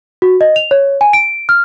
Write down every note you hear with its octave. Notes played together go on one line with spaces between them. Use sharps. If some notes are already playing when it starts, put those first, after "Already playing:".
F#4
D#5
F7
C#5
G#5
D7
F6